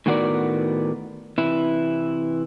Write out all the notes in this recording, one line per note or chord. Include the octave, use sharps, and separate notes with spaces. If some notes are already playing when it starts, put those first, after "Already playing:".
A2 D#3 B3 F#4 A#4 D5
C3 E3 E4